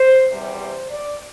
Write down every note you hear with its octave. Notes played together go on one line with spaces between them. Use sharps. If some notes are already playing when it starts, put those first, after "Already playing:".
Already playing: C5
E2 C3 G3
C5
D5